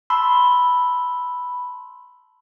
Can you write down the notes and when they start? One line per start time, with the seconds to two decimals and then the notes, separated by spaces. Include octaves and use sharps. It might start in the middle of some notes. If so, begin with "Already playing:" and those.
0.10 A5 B5 C6 E6